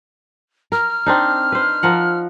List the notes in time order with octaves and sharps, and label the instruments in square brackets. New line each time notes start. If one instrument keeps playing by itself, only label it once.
[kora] A#4 [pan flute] F6
[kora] C4 D4 D#4
B4 C5
F3 A#4 F#5